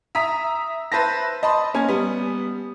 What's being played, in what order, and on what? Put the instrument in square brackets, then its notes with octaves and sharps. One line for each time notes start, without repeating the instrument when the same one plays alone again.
[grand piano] E5 A#5 D#6 B6
B4 C5 E5 A5 A#6
D#5 A5 B5 C6
A#3 C#4 G#5
G3 B3